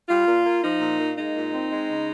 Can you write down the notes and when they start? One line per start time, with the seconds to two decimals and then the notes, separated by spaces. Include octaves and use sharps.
0.09 G3 F4
0.27 A#2
0.45 A#3
0.63 F3 D#4
0.81 A#2
0.99 A#3
1.17 G#3 D#4
1.36 A#2
1.53 C4
1.72 G#3
1.90 C#3